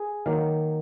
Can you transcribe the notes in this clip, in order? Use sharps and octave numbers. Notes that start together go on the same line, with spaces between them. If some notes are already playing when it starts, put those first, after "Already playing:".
Already playing: G#4
D#3 F#3 A#3 F5